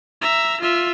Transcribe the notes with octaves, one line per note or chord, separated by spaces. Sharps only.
E5 A#5
F4 E5